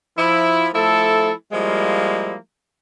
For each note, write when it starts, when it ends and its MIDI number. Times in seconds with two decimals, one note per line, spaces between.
0.17 0.68 53
0.17 0.68 64
0.74 1.32 53
0.74 1.32 57
0.74 1.32 64
0.74 1.32 69
1.52 2.36 53
1.52 2.36 55
1.52 2.36 56
1.52 2.36 58
1.52 2.36 64